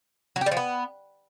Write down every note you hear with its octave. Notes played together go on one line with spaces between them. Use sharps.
F#3
G4
G3
F3
B3